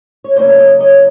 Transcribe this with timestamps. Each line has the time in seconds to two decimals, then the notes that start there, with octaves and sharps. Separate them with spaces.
0.24 C#5
0.36 E2 C#3 F#3 A#3 C#4 C5 D5
0.49 E5
0.58 C#5 D#5
0.80 C#5 D#5